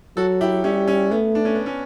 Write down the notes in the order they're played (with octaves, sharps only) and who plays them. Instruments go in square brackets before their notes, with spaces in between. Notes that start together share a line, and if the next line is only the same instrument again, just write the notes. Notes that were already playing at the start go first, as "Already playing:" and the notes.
[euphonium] F#3 [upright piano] F#4 A4
[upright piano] E4 G4
[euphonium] G3 [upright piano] C#4 E4
[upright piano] C#4
[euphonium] A3 [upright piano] B3
[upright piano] D4
C#4
B3
C#4